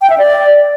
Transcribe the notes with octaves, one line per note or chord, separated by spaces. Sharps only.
G5
E5
D5